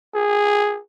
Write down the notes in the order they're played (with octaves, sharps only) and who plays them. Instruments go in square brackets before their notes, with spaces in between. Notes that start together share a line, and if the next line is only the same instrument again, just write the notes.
[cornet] G#4